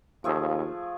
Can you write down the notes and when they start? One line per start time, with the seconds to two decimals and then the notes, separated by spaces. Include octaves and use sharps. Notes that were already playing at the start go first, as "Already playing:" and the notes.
0.24 D#2 F3 A3 G#4